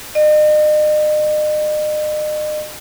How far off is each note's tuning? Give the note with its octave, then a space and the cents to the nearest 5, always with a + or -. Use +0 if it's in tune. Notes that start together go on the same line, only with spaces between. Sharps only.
D#5 -40